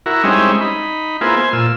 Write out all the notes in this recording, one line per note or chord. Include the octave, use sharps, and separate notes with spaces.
E4 F#4 A#4
G3 G#3 C4 C#4 D#4 E4
D#4 B5
A#3 B3 E4 F4 G#4 C5
C5 G#5
A#2 F4 E6